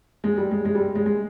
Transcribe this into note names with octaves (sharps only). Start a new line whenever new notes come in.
G#3
G3
G#3
G#3
G3
G#3
G#3